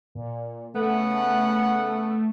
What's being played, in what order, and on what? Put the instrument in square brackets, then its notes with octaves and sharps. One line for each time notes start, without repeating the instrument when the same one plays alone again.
[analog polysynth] A#2
[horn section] C#3 B3 F#5 [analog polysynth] A3